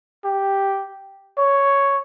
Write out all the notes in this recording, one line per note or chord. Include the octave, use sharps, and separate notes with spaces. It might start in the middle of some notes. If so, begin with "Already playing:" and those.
G4
C#5